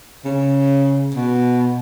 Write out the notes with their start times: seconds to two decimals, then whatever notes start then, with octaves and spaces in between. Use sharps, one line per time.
0.25 C#3
1.15 B2